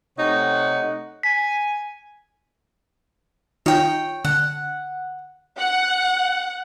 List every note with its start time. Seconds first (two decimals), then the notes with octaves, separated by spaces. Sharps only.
0.19 C3 A3 D#4 C#5 F#5
1.23 G#5 B6
3.66 D#3 D#4 F4 C#5 G5
4.25 D3 F#5
5.59 F#5